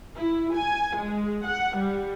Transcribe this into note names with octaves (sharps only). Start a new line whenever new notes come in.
E4
G#5
G#3
F#5
G3